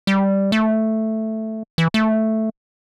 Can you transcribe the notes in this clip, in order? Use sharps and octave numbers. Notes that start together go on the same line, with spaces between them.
G3
A3
E3
A3